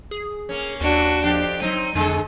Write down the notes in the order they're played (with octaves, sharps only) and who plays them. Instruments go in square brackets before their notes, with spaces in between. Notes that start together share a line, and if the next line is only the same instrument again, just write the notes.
[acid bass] G#4
[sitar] A#3 C#4
[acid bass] D#2 [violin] D4 F#4
[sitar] F2 D4 [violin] G4
[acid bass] F#3 [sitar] C4 D#4 [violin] D#7
[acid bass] F2 [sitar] D3 G#3 A4